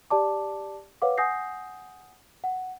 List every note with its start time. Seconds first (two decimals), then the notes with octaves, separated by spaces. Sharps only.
0.10 G4 D5 A5 D6
1.02 B4 C#5 F5 F#5 D6
1.18 F#5 G#5 D#6 G6 A#6 C7
2.44 F#5